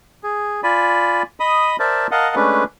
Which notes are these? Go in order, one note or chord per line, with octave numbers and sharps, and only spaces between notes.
G#4
F4 D5 G#5 B5
D#5 B5 D#6
A#4 C5 D5 E5 A5
A#4 D#5 F5 F#5 A5
G#3 A3 C#4 D4 B4